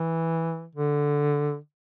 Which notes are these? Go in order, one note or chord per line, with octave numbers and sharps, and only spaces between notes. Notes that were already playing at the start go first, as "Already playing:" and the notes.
Already playing: E3
D3